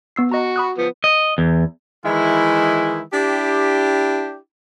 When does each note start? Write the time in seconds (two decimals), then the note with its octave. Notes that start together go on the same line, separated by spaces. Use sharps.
0.16 B3 E6 C7
0.32 F#4 D#5 A#5
0.56 B5 D#6 F#6
0.78 F3 B3
1.04 D#5
1.38 E2
2.06 D#3 E3 G#3 E4
3.13 D4 E4 G4